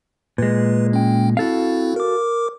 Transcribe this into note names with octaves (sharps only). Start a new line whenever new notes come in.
A#2 G#3 B4
C#4 G5
C4 E4 F#4 A4 F5
A#4 D6